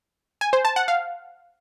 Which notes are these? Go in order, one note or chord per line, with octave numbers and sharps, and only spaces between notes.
G#5
C5
A5
F#5
F5